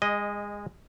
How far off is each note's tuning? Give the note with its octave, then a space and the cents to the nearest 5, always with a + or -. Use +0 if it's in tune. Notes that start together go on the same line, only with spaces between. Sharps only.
G#3 -25 D#5 +0